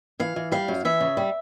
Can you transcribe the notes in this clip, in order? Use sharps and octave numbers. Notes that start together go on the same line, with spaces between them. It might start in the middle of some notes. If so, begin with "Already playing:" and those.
E3 F5
E3
G3 F5
F#2
E3 E5
C#3
G3